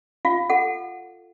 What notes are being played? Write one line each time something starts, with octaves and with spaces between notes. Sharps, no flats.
F4 F5
A4 F#5